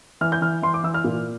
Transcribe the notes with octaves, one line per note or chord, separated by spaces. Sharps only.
E3 F6
G6
E3 F6
E3 C6
D6
E3 E6
F6
A#2